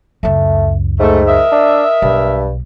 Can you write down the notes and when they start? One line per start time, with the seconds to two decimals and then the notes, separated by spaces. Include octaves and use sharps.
0.23 C#2 F#2 A3
1.00 G#2 A3
1.28 A#4 D#5 E5
1.52 D4
2.02 B1 G2